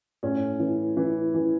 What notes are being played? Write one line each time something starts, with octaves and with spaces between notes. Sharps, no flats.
A2 C#4
E3
E3
E3